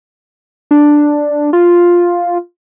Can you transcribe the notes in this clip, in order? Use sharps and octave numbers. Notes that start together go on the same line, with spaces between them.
D4
F4